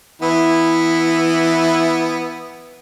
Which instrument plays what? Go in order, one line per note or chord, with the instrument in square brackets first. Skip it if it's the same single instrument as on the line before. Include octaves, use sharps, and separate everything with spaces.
[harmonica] E3 B3 E4